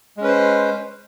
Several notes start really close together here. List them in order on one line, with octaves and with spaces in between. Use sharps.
G#3 C#4 B4 C5